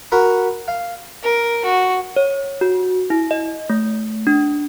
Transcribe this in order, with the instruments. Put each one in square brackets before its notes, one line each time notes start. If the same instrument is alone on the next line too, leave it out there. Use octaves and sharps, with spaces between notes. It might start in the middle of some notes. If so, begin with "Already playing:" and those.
[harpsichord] F#4 A#4 B5
F5
[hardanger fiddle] A#4
F#4
[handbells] C#5
F#4
E4
D#5
A3
D4